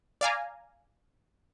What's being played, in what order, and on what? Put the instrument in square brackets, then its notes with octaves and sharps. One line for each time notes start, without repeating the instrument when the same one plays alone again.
[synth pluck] D5 F5 G#5 A#5